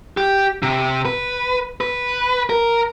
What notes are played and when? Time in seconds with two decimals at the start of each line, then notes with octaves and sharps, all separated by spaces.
0.17 G4
0.63 C3
1.05 B4
1.81 B4
2.50 A#4